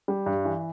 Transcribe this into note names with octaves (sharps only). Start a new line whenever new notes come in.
G3
G2
E3